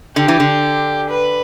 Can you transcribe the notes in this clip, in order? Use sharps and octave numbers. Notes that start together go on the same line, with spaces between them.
D3 G4
E3
D3
B4